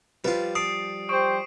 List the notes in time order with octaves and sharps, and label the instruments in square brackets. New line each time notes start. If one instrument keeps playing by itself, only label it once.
[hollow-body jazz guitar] F3 G3 [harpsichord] F4 B4
[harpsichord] A5 [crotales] D#6 C7 D7
[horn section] G4 C5 [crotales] C#6 D#6 D7